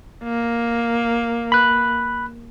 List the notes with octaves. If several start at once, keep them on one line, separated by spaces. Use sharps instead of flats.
A#3
B5 F#6